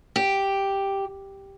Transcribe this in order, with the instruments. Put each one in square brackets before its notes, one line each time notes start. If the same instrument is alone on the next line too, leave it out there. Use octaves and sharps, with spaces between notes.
[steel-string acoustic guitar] G4